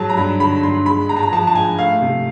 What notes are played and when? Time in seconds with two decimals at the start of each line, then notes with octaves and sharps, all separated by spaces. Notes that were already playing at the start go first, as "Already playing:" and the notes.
Already playing: G#2 F#3 A5
0.10 A#5
0.17 G2 B5
0.40 D3 B5
0.63 G2 C6
0.86 G#3 B5
1.09 G#2 A#5
1.16 A5
1.23 A#5
1.32 F3 A5
1.47 A5
1.55 G#2 G#5
1.79 A3 F5
2.02 C3